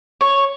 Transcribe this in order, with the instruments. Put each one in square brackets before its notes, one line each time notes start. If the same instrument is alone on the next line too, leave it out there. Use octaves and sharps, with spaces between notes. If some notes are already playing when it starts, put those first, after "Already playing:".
[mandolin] C#5